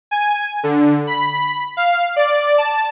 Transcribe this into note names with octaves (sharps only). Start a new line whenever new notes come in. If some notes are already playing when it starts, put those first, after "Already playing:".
G#5
D3
B5
F5
D5
A5